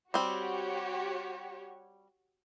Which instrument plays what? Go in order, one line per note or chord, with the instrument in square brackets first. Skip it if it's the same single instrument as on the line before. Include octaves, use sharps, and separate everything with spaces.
[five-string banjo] G3 C4 [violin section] F#4 G4 C#5